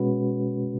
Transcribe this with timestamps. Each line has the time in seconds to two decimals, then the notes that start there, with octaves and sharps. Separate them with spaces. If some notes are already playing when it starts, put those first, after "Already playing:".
Already playing: B2 G#3 C#4 F#4 B4